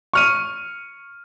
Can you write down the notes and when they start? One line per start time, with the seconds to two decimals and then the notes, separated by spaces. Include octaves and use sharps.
0.13 C#6 F6 D#7